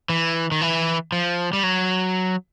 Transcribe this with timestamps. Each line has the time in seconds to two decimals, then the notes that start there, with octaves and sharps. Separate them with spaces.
0.09 E3
0.52 D#3
0.61 E3
1.12 F3
1.53 G3
1.63 F#3